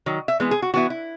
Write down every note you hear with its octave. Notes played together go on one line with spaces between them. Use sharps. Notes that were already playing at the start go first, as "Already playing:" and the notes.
D#3 F#3
E5
E3 G#3 B3
G#4
F#4
E3 B3 E4 F#4
E4